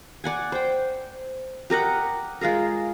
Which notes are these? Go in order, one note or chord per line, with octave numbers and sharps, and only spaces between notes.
D5 F#5 G#5
C5 G5
G4 A#4 D#5 F#5
G#3 F4 G#4 A#4